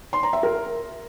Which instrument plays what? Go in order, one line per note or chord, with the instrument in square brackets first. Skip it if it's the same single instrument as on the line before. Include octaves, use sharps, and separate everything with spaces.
[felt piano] C6
A#5
E5
A#4